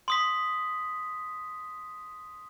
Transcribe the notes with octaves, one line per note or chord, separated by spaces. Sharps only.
C6 D#6 B6